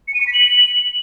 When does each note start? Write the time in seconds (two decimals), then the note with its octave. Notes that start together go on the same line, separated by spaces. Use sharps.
0.08 C#7
0.14 D#7
0.21 C#7
0.27 B6
0.34 F#7